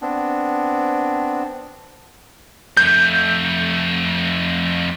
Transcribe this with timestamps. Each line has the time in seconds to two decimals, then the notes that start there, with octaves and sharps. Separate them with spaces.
0.02 B3 C4 D4
2.77 F2 A3 G6